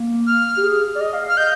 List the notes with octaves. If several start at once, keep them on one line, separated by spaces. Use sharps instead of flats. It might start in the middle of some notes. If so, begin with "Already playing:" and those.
Already playing: A#3
F6
G4
G#4
D5
D#5
F5
F5
F6
D#5 G6